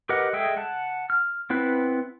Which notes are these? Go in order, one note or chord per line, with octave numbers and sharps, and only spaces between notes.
G4 A#4 B4 D#5 F#5
G#3 G#4 A4 E5 G5
F#5 A5
F6
B3 C4 E4 B4